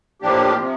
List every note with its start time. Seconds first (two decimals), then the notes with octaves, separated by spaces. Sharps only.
0.22 A2 F3 A#3 D4 G4
0.58 C3 F3